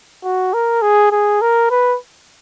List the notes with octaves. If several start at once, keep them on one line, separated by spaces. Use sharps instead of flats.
F#4
A#4
G#4
G#4
A#4
B4